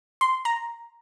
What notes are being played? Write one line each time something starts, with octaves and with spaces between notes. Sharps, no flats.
C6
A#5